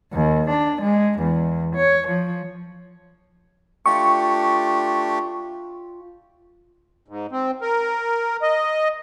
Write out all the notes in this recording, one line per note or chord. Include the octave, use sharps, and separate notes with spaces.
D#2
D4
G#3
E2
C#5
F3
A3 D4 F4 G4 G5 C#6
G#2
C4
A#4
D#5